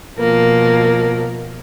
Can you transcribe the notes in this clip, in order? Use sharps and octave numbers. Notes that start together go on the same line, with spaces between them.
B2 F3 A#3